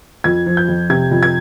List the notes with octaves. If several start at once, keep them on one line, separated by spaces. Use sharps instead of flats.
F2 G#6
F3
G6
F2
C3 G#6
F2
G#6